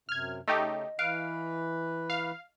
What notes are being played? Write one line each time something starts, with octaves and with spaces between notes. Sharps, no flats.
F#2 C3 F6 G#6
C#3 A3 D#4 G4 D#5
E3 B4 F5 F#6 D7
F5